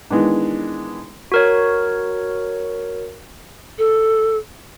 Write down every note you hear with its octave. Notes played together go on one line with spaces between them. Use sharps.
D#3 E3 G#3 B3 D4
F#4 A#4 C#5
A4